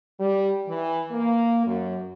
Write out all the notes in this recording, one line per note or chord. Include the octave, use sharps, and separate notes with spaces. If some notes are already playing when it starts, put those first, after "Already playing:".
G3
E3
A#3
F#2